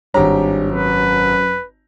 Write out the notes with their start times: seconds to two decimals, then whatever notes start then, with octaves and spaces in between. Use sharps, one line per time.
0.14 G#1 G2 G4 C#5 A#5
0.71 F#2 B4